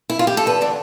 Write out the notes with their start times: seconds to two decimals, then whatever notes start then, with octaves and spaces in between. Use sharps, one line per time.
0.10 E4
0.19 F4
0.27 G4
0.37 A4
0.46 E2 B4
0.61 D3 D4